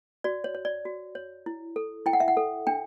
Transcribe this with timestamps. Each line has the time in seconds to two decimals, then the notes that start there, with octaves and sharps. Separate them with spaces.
0.24 F#4 D5
0.44 C#5
0.54 C#5
0.65 D5
0.85 F#4
1.15 C#5
1.46 E4
1.76 A4
2.06 E4 G5
2.13 F#5
2.20 E5
2.28 F#5
2.37 A4
2.67 D4 G5